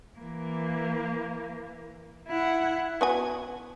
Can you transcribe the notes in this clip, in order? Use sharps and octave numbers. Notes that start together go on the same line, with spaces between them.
E3 A#3
E4 F#5
B3 F#4 G#5